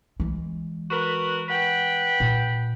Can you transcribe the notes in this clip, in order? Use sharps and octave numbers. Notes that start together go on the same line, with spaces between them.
E3 G#3
F#4 A#4 B4
B4 F#5 G5
A#2